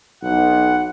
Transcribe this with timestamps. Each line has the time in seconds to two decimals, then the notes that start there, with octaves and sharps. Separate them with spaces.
0.23 B1 F#5